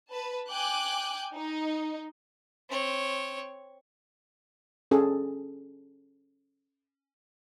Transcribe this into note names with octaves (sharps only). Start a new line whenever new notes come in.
B4 A5
G5 G#5 D6 F#6 G6
D#4
C4 C#5
C#4 G#4 A4